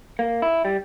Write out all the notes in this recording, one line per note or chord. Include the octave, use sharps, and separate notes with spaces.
A#3
E4
G3